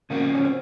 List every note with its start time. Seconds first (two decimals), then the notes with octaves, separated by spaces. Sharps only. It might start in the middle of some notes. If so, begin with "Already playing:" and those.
0.10 C#3 F3 A#3 C4 F#4
0.35 C#4
0.45 C4